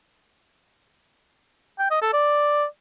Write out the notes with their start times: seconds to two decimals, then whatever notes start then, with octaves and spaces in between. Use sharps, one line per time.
1.79 G5
1.91 D#5
2.02 A4
2.13 D5